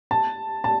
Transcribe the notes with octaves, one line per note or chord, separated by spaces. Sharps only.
A5
A5